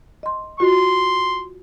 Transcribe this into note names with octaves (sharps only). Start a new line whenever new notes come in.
D#5 C6
F4 F#4 D#5 C6